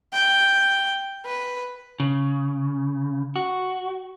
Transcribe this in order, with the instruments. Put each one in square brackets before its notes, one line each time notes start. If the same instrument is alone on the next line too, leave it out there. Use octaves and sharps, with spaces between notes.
[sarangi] G5
B4
[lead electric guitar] C#3
F#4